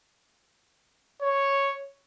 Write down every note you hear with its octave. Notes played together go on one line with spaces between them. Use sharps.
C#5